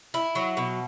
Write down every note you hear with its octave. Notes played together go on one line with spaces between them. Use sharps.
E4
F#3
B2